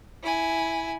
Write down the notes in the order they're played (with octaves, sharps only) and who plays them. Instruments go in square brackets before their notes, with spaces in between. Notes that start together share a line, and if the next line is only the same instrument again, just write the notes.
[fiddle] E4 G#5